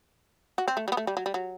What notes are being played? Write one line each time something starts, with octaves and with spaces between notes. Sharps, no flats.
F#4
C4
A3
G3
B3
A3
G3
F#3
G3
F#3